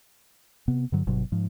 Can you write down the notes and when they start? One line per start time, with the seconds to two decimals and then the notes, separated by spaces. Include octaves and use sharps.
0.68 C3 B3
0.92 G2 D3 F#3
1.07 G1 B2 F#3
1.32 G#2 F3